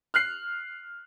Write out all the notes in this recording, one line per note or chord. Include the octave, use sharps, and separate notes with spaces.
F6 F#6 C7